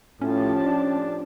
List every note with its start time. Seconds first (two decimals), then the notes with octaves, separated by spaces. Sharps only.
0.22 A2 F3 C#4 G4 A5
0.65 D4